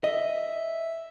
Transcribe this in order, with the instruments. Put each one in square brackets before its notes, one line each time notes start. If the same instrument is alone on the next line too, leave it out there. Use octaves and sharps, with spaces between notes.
[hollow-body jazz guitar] D#5 [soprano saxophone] E5